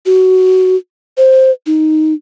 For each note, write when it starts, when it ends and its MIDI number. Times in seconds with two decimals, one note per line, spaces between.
0.06 0.76 66
1.17 1.51 72
1.66 2.13 63